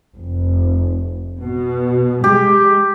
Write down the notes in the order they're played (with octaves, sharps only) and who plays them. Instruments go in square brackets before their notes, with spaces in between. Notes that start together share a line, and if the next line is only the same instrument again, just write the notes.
[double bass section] F1
B2
[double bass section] G#3 [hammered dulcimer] G4